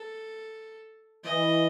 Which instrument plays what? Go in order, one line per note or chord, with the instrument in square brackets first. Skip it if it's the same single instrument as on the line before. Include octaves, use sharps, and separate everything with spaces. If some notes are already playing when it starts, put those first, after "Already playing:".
Already playing: [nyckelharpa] A4
[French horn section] E3 [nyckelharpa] D#5